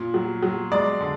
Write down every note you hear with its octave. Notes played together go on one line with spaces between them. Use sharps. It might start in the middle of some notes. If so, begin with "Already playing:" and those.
Already playing: A#2
F#3
F#3
G#3 D5
D3